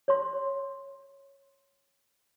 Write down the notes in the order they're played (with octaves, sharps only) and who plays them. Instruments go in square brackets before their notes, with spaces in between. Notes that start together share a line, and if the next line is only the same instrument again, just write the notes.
[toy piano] C#5 C6